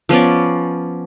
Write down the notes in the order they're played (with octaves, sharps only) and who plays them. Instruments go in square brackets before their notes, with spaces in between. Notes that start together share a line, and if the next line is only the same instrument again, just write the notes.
[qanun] F3 B3 C#4 D5